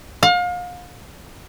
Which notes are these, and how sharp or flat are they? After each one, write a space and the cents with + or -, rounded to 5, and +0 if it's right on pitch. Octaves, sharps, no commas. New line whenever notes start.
F5 +35